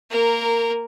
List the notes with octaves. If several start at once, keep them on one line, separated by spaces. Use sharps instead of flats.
A#3 A#4